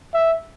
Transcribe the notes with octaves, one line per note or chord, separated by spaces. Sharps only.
E5